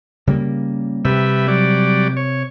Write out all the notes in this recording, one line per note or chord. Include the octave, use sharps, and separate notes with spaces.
C#3 G3 A#3
C3 G3 B4 E5
F#3 G3 D5
C#5